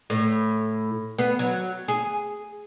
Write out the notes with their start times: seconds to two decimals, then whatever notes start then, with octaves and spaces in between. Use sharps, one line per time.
0.10 A2
1.19 B3
1.39 F#3
1.88 G#4